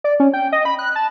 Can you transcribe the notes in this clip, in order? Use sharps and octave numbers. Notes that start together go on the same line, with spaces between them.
D5
C#4
G5
D#5
B5
F#6
A5